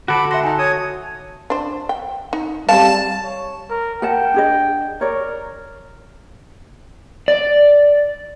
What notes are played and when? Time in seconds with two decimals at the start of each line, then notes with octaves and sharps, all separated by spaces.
0.08 D3 F#4 A4 B5 D6
0.31 E5 F#5 C6 A#6
0.44 D#4 G#5 A5
0.59 C#5 D#6
1.50 D4 C5
1.89 G5
2.33 D#4
2.69 G3 G#3 C4 F5 A5
3.24 C#5
3.70 A#4
4.02 A#4 F#5 G5 A5
4.34 D4 G#4 D#5
5.01 A#4 C#5 D5
7.28 D5